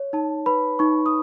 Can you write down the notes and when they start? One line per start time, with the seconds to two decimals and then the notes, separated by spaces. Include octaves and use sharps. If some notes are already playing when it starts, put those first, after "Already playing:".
Already playing: C#5
0.13 D#4 A5
0.46 B4 B5
0.79 D#4 C#6
1.06 D#6